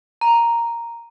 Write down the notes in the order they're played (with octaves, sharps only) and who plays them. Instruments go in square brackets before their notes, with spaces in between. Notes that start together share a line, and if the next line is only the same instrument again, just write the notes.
[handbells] A#5